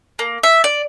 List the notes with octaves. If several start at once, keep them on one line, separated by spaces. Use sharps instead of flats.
A#3
E5
D5